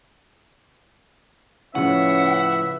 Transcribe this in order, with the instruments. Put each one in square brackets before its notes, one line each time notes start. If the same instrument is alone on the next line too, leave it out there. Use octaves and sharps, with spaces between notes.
[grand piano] A2 C#3 F3 [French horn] C#4 [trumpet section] B4 E5 [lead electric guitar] F#5